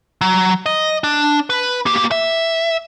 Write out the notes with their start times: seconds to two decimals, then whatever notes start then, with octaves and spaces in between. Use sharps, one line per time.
0.21 F#3
0.66 D#5
1.04 D4
1.50 B4
1.86 A#3 G4
2.11 E5